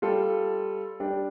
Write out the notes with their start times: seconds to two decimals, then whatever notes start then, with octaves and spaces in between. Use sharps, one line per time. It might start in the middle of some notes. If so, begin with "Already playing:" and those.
0.02 G3 F4 A4
1.00 G3 D4 G4